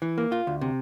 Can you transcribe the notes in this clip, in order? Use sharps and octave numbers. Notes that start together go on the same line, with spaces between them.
E3
A#3
F4
D2
C3